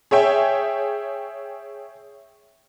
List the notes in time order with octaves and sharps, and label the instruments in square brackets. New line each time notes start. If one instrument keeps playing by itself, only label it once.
[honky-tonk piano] G#4 C#5 E5 G5